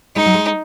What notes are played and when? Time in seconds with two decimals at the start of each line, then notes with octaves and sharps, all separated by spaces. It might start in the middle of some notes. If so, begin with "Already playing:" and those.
0.16 G#3 D#4
0.26 F#3
0.34 G#3